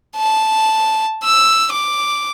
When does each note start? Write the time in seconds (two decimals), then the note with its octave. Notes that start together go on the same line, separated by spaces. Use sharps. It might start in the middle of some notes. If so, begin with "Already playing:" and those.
0.17 A5
1.24 E6
1.73 D6